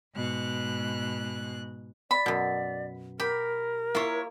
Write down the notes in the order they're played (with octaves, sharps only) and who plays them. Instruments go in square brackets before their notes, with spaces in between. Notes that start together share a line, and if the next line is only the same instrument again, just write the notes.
[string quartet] G#2 B2 F#6
[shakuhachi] D5 [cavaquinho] B5
[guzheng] F#2 B2
[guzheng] G4 [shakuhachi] A#4 [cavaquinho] B5
[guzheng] A#3 F4 [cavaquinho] E4 C#5